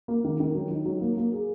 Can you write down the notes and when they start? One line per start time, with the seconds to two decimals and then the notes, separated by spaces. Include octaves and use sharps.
0.08 A#3
0.25 D#3
0.40 D#3
0.55 F#3
0.71 D#4
0.85 F#3
1.01 A#3
1.17 A#3
1.33 G#4